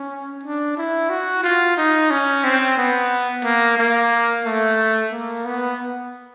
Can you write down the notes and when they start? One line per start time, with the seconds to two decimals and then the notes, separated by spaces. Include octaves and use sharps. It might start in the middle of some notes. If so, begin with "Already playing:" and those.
Already playing: C#4
0.43 D4
0.77 E4
1.10 F#4
1.43 F4
1.77 D#4
2.10 C#4
2.44 C4
2.78 B3
3.44 A#3
3.78 A#3
4.45 A3
5.12 A#3
5.45 B3